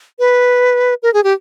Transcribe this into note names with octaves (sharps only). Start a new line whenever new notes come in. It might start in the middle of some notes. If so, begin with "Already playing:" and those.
B4
A#4
G#4
G4